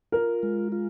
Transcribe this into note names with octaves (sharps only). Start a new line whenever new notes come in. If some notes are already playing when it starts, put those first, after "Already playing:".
F4 A#4
G#3
F4